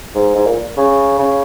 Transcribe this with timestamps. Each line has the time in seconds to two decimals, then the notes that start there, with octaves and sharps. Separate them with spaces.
0.15 G#2
0.35 G#2
0.46 A#2
0.77 C#3
1.19 C#3